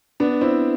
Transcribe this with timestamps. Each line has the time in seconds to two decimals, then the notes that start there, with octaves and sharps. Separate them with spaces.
0.20 B3 D4
0.41 C4 E4